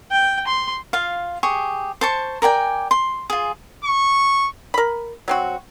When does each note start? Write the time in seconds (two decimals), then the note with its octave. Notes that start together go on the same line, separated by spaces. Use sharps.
0.11 G5
0.47 C6
0.93 F4 F5
1.43 G4 G#4 C#6
2.01 C5 A5 C#6
2.42 A#4 D5 G5 G#5
2.91 C6
3.30 F4 G#4
3.84 C#6
4.74 A#4 B5
5.28 F#3 C4 F#4